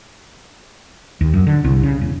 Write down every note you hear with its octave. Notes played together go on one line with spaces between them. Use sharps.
D#2
F#2
D3
C2
C#3
E1